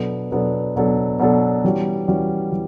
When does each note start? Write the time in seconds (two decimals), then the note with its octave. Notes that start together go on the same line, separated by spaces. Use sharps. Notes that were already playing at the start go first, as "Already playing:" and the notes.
Already playing: B2 F#3 B3 D4 A4
0.32 B2 F#3 B3 D4 A4
0.76 B2 F#3 B3 D4 A4
1.19 B2 F#3 B3 D4 A4
1.64 E3 G3 C#4 F#4
2.08 E3 G3 C#4 F#4
2.52 E3